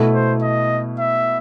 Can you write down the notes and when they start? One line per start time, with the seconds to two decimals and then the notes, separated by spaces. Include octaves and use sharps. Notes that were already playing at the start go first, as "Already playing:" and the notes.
Already playing: B2 A3 E4
0.14 C5
0.43 D#5
0.99 E5